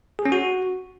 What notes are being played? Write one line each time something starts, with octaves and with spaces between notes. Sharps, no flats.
G#4
C#4
F#4